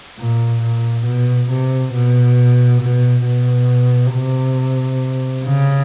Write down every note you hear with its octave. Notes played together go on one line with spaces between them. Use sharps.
A#2
A#2
B2
C3
B2
B2
B2
C3
C#3